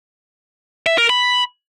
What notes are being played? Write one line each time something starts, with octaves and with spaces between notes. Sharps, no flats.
E5
A#4
B5